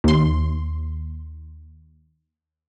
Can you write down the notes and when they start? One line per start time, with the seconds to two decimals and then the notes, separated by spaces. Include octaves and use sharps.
0.04 D#2 C6